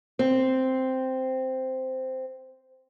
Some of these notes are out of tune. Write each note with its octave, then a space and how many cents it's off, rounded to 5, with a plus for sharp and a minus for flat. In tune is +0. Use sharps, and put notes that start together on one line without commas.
C4 -5